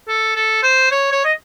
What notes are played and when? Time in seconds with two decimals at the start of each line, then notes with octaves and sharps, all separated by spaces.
0.08 A4
0.36 A4
0.63 C5
0.91 C#5
1.12 C#5
1.24 D#5